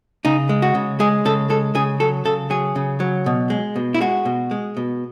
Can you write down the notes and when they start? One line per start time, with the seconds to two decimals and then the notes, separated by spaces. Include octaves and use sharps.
0.25 C#3 D#4
0.49 G#3
0.62 F#4
0.75 C#3
1.00 G#3 G#4
1.25 C#3 A4
1.50 G#3 A4
1.75 C#3 G#4
2.00 F#3 A4
2.25 C#3 A4
2.50 F#3 G#4
2.76 C#3
3.00 F#3
3.26 B2
3.50 G#3
3.76 B2
3.94 E4
4.01 G#3 F#4
4.25 B2
4.51 G#3
4.77 B2